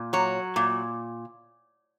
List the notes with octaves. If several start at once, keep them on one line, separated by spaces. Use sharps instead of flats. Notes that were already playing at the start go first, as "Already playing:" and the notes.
Already playing: A#2
F#3 C#5
A#2